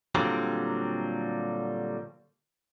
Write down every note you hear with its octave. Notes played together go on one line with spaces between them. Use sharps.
A#2 D3 F#3 G3 C4